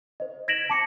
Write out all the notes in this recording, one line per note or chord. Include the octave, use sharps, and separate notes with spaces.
C5 D#5
G#6 A#6 B6 D7 E7 F#7
A5 D6 C#7